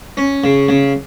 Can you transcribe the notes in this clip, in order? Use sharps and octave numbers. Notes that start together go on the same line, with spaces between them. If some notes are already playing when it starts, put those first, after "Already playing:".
C#4
C#3
C#3